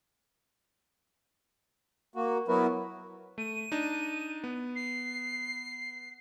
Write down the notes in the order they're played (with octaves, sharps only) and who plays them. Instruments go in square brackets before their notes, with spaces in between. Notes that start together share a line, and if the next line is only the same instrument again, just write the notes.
[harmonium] A#3 F#4
F#3 B3 E4 F#4 A#4 B4
[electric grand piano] A3 [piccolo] D#7
[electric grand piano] D4 D#4
B3
[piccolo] C7